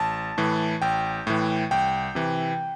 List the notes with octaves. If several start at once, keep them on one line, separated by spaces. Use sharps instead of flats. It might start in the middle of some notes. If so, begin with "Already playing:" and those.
Already playing: A1 A5
A2 E3
A1 G5
A2 E3
C2 G5
C3 E3